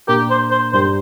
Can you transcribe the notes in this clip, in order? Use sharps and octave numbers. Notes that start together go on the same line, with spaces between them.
A#2 A#3 D4 G4 A#4
C5
C5
G2 G3 D4 G4 A#4 C5